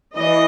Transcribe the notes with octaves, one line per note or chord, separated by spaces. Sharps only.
E3 D#5